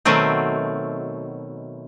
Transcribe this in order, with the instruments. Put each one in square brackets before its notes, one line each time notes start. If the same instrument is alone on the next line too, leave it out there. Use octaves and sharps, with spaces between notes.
[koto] B2 D#3 F#3 A3 C4